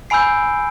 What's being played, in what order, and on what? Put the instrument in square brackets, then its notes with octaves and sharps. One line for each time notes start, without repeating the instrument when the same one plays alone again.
[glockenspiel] G#5 B5 E6 G6 C7 D7